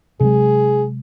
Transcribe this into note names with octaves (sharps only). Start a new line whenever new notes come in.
C3 F#3 G#3 G#4